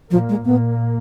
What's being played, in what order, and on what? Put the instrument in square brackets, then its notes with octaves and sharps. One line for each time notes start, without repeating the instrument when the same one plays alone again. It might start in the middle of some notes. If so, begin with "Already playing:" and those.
[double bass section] A#2 A#3 [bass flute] F3
[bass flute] G#3
[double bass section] A#2 A#3 [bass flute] B3